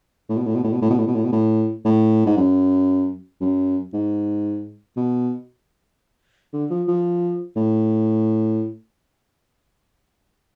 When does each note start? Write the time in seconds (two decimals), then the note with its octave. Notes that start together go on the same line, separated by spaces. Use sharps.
0.30 A2
0.37 B2
0.46 A2
0.55 B2
0.64 A2
0.73 B2
0.82 A2
0.90 B2
0.99 A2
1.07 B2
1.15 A2
1.25 B2
1.32 A2
1.85 A2
2.26 G#2
2.37 F#2
3.41 F#2
3.94 G#2
4.97 B2
6.53 D3
6.71 F3
6.88 F3
7.56 A2